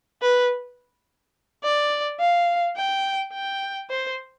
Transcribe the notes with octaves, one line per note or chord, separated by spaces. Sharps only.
B4
D5
F5
G5
G5
C5